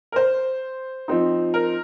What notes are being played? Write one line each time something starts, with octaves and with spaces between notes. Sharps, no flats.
A#4
C5
F3 C4 D#4
A#4